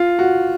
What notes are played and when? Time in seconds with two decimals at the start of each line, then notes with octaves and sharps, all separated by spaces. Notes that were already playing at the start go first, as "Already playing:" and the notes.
Already playing: F4
0.19 F#4